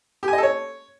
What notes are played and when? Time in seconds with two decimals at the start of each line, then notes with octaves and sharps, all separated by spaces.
0.23 G4
0.28 G#5
0.33 D#5
0.38 A4
0.43 C#5